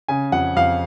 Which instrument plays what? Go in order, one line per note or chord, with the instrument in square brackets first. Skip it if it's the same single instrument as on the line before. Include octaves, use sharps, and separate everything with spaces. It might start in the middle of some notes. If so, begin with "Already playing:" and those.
[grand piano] C#3 G#5
F2 F#5
F2 F5